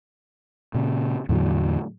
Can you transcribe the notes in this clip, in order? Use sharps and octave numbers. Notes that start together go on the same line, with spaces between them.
A#2 C#3
E2 A2 D3 F#3